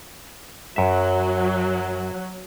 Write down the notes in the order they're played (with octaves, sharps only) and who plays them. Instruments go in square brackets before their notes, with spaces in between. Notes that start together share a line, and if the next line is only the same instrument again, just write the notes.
[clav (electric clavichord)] F#2 E5 [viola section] F#3